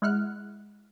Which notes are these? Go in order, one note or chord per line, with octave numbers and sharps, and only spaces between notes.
G#3 E4 F#5 F6 F#6